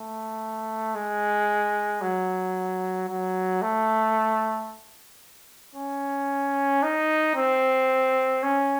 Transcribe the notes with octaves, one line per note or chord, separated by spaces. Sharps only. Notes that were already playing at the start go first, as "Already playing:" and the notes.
Already playing: A3
G#3
F#3
F#3
A3
C#4
D#4
C4
C#4